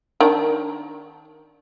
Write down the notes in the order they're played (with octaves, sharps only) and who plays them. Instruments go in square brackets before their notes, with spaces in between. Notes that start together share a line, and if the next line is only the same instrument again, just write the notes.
[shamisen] D#3 D4